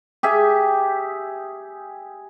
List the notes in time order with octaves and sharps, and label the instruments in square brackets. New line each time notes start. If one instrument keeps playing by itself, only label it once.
[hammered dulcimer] G4 G#4 E5